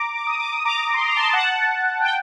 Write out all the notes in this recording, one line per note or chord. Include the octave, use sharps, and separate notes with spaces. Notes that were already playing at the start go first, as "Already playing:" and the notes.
Already playing: A#5 D6
D6
D#6
D6
D#6
A#5 D6
C6
A#5
A5 C6
F#5 A5
G5